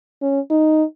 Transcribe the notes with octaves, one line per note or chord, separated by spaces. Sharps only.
C#4
D#4